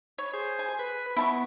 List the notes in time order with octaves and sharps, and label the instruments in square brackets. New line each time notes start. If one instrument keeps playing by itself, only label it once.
[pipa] C#5
[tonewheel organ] G#4 C5
[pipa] G#5
[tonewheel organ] B4
[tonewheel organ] B3 [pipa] E4 A5 C#6